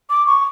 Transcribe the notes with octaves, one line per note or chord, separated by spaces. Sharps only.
D6
C#6